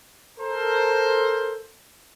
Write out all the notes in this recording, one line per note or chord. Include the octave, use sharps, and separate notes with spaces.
A4 A#4 C5